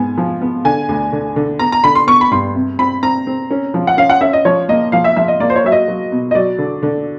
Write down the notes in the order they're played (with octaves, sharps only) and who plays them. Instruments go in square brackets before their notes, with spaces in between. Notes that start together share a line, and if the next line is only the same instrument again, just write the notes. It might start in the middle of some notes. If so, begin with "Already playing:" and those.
Already playing: [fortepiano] G#2 B3 [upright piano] G#5
[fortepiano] F3
B3
[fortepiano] D3 [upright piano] G#5
[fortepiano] D2
D3
D3
[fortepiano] B3 [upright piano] A#5
[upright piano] A#5
[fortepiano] D3 [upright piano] B5
[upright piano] C6
[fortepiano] B3 [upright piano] C#6
[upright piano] B5
[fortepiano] G2 [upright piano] C6
[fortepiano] C3
[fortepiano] C4 [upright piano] B5
[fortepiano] C4 [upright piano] A#5
[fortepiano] C4
C#4
F3
[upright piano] F#5
[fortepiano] C#4 [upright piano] F5
[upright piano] F#5
[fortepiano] C#4 [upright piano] E5
[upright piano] D#5
[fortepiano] F3 [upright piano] C#5
[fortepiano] A#3 [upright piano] D#5
[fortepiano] F3 [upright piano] F5
[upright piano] E5
[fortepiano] F3 [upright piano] E5
[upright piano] D#5
[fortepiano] A#3 [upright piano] D5
[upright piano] C5
C#5
[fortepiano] F#3 [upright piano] E5
[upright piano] D#5
[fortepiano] F#3
B2
[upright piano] D#5
[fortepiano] F#3 [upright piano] D5
[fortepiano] D3
D3